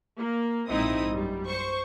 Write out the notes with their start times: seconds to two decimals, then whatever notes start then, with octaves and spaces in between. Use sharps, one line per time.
0.17 A#3
0.69 A#1 G#2 C4 D#4 E4 D#6
1.13 F#2 G3
1.47 C5 C#6